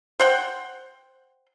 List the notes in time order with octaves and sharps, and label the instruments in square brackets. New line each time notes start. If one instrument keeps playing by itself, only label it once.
[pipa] C5 F#5 G5